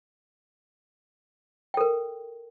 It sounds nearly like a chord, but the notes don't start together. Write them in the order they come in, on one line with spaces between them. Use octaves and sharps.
G5 A4 A#4